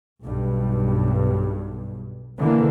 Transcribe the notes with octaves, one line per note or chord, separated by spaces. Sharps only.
B1 G2
D3 E3 A#3